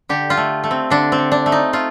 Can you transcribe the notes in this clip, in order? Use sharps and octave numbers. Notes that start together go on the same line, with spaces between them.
D3 G4
F4
A3
A3
C4
D3 D4
C4
D3
D4
A3
D#4
A3 F4